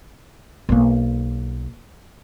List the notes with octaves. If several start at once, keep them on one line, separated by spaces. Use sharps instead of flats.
B1 A#3